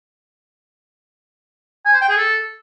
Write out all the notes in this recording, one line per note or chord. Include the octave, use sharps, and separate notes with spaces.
G#5
C5
G5
G#4
A4